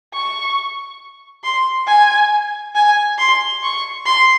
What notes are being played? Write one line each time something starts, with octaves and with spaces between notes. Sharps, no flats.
C#6
C6
G#5
G#5
C6
C#6
C6